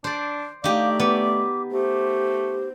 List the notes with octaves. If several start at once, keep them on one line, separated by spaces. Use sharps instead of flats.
D4 C5 D5
A3 D#4 G4 D5 F5
B3 D6
A3 G4 C5